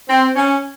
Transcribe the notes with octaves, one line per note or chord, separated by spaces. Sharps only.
C4
C#4